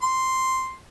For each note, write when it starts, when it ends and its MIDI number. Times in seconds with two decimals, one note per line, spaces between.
0.02 0.73 84